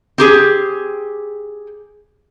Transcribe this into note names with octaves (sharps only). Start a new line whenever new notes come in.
C4 G4 G#4